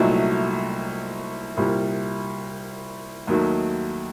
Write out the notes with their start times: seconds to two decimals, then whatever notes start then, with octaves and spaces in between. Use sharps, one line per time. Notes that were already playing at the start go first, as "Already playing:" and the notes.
Already playing: C2 A#2 F#3 A3 D#4
1.57 C2 A#2 G3 A#3
3.27 D#2 D#3 F#3 A3